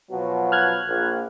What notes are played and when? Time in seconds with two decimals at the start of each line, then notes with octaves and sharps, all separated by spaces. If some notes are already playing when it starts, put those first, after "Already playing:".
0.10 B2 F3 F#3
0.52 F6 F#6 G#6
0.86 A#1